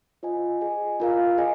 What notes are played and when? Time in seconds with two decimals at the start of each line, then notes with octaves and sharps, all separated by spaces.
0.23 F4 C5 D#5 G#5
0.61 G#4 D#5 G#5
1.00 F4 A#4 F5
1.37 G#4 D#5 G#5